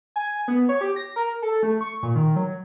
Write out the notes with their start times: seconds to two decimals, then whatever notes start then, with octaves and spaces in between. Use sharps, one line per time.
0.16 G#5
0.48 B3
0.69 C#5
0.81 G4
0.96 A#6
1.16 A#4
1.42 A4
1.63 A3
1.81 C#6
2.03 A#2
2.15 D#3
2.36 F#3